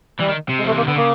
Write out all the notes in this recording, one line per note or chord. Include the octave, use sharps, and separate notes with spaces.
E3 G3
D#3
C3
G#3
F3 A3
E3
A#3
D#3
D3 B3
C#3 A#3